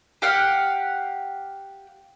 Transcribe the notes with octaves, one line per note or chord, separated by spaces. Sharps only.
G4 F5 F#5